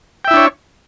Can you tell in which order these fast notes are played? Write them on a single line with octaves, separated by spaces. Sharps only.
G5 E5 E4 D4 C#5